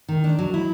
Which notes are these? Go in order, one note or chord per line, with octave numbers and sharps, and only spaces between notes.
D#3
D4
F#3
E4